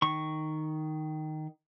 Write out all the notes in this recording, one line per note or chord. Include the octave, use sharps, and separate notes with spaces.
D#3 C#6